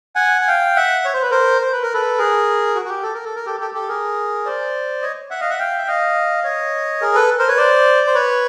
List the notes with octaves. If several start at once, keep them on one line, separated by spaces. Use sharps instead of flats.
F#5 G#5
G#5
F5 G5
E5 F#5
C#5
C5
B4
A#4 C5
C5
B4
A#4
A4 B4
G#4 A#4
F#4
F#4
G4
A4
A#4
A4
A#4
G4 A4
G4 A4
G4 A4
G#4 A#4
C5 D5
C#5 D#5
E5 F#5
D#5 F5
E5 F#5
F5 G5
E5
D#5 F5
C#5 D#5
G#4 A#4
A4 B4
A#4 C5
B4 C#5
C5 D5
C5
B4 C#5